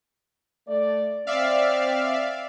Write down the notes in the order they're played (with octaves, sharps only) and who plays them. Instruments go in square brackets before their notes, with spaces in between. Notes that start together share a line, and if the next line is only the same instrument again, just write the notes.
[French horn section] A3 D5
[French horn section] C4 [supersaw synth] D5 E5 F5